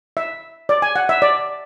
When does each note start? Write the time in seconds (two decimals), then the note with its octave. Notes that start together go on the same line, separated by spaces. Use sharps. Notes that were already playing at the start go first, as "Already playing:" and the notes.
0.17 E5
0.69 D5
0.82 G#5
0.96 F#5
1.09 E5
1.22 D5